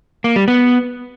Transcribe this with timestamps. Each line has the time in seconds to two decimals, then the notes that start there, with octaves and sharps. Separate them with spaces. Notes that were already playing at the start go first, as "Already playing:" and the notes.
0.24 A#3
0.36 G3
0.48 B3